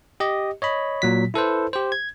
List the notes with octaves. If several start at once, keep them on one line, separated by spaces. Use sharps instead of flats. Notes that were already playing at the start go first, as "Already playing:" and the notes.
G4 D#5
C#5 D#5 B5
A#2 F#3 B6
E4 A4 B4 C5
G4 C5
G#6